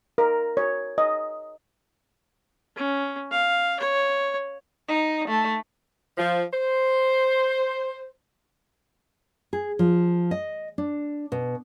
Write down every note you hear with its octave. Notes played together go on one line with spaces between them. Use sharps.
A#4
C#5
D#5
C#4
F5
C#5
D#4
A3
F3
C5
G#4
F3
D#5
D4
B2